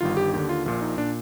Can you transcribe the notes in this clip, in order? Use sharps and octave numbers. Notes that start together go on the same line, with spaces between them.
G1 G2 D#3 F4
G4
D#2 D3 G4
F4
A#1 A#2 F4
D#4
A#2 D4